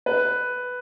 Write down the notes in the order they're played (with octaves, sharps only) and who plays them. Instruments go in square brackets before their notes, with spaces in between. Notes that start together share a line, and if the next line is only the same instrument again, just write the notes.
[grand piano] B4